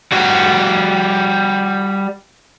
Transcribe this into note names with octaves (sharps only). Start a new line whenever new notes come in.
G3 F#4